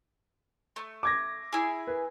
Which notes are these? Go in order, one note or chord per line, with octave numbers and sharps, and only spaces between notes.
A3
D6 G#6 A#6
E4 G#4
B4